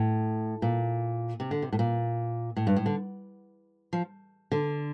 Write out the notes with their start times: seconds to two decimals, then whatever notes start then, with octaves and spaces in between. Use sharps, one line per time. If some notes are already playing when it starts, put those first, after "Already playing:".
Already playing: A2
0.62 A#2
1.40 C3
1.51 D3
1.62 C3
1.72 A2
1.79 A#2
2.56 A2
2.67 G2
2.76 A2
2.86 D3
3.93 F3
4.52 D3